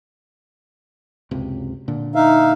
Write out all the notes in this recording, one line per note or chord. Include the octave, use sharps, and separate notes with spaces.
F#1 C#2 C3
A#2 D3
D#4 E5 F5